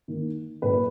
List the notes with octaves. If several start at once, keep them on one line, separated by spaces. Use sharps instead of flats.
D#3 A#3
A#2 F#3 A#3 B4